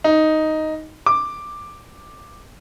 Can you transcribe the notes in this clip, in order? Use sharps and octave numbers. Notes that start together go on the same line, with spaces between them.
D#4
D6